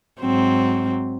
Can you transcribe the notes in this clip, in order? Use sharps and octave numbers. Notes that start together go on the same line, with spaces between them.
G#2 F#3 C4